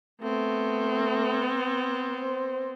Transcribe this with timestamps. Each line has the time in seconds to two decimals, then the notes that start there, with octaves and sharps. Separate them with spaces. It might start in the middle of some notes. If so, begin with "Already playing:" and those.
0.23 A3 B3 C4
2.20 C5